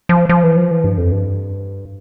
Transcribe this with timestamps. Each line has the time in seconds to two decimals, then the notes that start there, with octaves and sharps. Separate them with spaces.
0.09 F3
0.29 F3
0.43 E3
0.57 F3
0.71 E3
0.84 G2
0.98 F2
1.12 G2